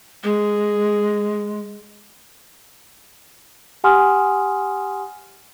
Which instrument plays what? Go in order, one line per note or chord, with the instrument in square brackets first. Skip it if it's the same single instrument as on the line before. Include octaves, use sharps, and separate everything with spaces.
[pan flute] G#3 [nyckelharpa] G#4
[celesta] G4 F#5 G#5 C6 D#6 F6